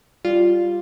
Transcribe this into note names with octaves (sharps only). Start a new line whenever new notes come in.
G3 F4